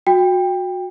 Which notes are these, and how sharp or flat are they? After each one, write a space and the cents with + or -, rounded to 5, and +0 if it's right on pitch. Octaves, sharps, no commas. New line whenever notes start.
F#4 -25 G5 +15